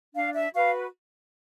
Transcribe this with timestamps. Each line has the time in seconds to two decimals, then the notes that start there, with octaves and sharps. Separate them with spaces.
0.14 D4 F5
0.34 E5
0.53 F#4 B4 F5